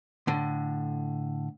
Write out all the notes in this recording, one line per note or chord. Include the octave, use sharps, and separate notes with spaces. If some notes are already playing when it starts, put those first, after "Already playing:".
A2 D3